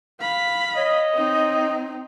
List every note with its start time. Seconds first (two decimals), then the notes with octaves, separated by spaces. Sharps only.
0.21 F5 B5
0.75 C#5 D#5
1.14 C4 D#4